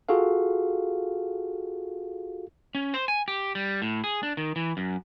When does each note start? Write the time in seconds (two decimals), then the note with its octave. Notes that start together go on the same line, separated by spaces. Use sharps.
0.09 F4 F#4 G#4 A4 F5
2.75 C#4
2.94 C5
3.08 G#5
3.28 G4
3.55 G3
3.82 A2
4.04 G#4
4.23 D4
4.37 D#3
4.56 E3
4.77 F#2